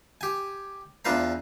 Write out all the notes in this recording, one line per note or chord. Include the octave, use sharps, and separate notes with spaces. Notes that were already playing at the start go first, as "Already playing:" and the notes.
G4 G#5
E2 D4 F4 B4 C5 A#5